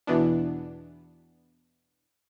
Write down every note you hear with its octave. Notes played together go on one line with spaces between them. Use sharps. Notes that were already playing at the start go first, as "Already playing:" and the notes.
E2 B2 E3 B3 D4